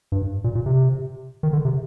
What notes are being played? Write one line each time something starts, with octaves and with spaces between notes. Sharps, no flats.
G2
A#2
A#2
C3
D#3
D3
C3